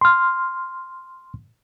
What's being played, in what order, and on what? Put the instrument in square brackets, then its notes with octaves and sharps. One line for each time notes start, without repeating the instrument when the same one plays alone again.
[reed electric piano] C6 F6